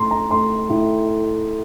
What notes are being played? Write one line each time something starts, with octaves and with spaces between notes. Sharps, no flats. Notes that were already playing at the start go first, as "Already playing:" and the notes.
Already playing: A2 A3 A#5 C6
A#5
A3 C6
A2